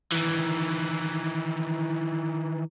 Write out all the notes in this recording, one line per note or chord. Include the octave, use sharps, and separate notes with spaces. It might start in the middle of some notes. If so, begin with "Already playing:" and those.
D#3 E3